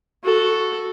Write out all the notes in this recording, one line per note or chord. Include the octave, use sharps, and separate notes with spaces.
F#4 A4